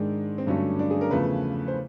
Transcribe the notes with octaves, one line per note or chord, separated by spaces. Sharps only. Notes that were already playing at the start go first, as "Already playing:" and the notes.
Already playing: G#2 D#3 G#3 D4
C4
G2 D3 F#3 A3 C#4
D4
G#4
A#4
E2 C#3 F3 A3 B4
C5